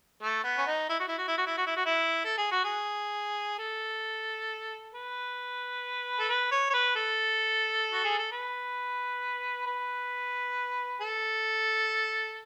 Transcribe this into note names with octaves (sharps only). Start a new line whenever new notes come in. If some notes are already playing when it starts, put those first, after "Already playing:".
A3
B3
C#4
D#4
E4
F#4
E4
F#4
E4
F#4
E4
F#4
E4
F#4
E4
A4
G#4
F#4
G#4
A4
B4
A4
B4
C#5
C#5
B4
A4
F#4
G#4
A4
B4
B4
A4